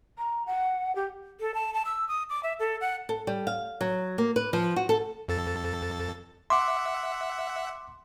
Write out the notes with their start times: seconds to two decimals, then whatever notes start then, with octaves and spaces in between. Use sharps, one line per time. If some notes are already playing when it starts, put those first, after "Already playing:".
0.18 A#5
0.46 F#5
0.95 G4
1.41 A4
1.54 A5
1.74 A5
1.85 E6
2.08 D#6
2.30 D6
2.43 E5
2.60 A4
2.81 F#5
3.09 A4
3.27 G3
3.47 F5
3.81 F#3
4.18 A#3
4.36 B4
4.53 F3
4.76 F#4
4.89 A4
5.28 F2 A4 A6
6.50 E5 F#5 C6 D6